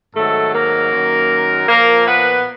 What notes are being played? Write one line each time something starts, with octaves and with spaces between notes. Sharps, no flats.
G#2 D#3 F#3 A3 A4
A#3 A#4
F#2 D#3 F#3
A#2 F3 A#3 A#4
B3 B4